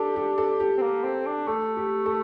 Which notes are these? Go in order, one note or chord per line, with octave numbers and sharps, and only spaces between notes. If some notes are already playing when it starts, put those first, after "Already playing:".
Already playing: D4 G4 A4
G4
A4
G4
C4
A#3
C4
D4
A3 A4
G4
A4